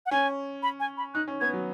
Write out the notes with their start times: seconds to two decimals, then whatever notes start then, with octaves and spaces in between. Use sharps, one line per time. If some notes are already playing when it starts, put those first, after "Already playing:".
0.06 F#5
0.11 C#4 G#5
0.63 B5
0.80 G#5
0.97 B5
1.14 D#4 F#6
1.28 C#4
1.41 B3 G#6
1.53 F#3